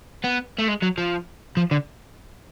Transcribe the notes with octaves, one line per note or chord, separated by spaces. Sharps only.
B3
A3
G#3
F#3
F3
F3
D3